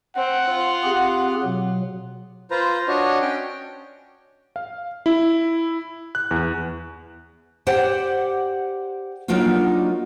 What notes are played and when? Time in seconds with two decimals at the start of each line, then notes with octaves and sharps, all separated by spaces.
0.16 C4 F#5
0.49 F4
0.83 C4 G4 G#4
1.43 B2 F#3
2.51 F4 B4 C5 A#5
2.88 D4 F#4 C#5 D#5
3.22 C#4 G5
4.56 F5
5.06 E4
6.15 F#6
6.31 E2
7.67 G4 C5 D5 F#5 G5
9.28 F#3 A#3 D4 D#4 F4 F#4